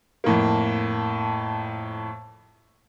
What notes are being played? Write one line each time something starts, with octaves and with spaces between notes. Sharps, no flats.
F2 A2 A#3